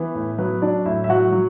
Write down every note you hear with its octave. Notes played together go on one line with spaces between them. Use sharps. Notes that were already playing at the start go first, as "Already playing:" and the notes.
Already playing: E3 B3 B4
A2
F#3 B3 B4
F#3 D4 D5
A2 E4 E5
E5
F#3 F#4 F#5
F#3